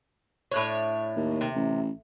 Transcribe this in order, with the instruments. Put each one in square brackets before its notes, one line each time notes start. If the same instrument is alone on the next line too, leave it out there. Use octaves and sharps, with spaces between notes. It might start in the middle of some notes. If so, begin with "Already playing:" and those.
[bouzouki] A2 D4 C#5
[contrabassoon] D#2
[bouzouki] C3
[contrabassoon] A1